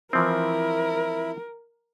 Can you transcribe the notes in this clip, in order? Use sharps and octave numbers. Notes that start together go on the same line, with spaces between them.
E3 F3 C4 E4 A#4